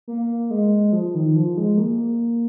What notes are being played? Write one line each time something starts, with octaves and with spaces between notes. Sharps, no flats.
A#3
G#3
F3
D#3
F3
G#3
A#3